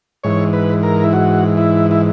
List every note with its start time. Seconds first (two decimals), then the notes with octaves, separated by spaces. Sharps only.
0.23 G#2 E3 C#5
0.53 B4
0.83 A#4
1.04 E4
1.13 F#4
1.57 E4
1.91 E4